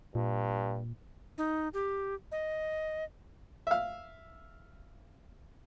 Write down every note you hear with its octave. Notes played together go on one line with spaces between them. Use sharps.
G2 A#2
D#4
G4
D#5
E5 F5